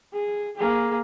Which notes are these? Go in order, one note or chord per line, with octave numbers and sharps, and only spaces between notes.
G#4
A#3 G#4